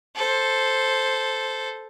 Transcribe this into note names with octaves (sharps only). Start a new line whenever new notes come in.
A4 C5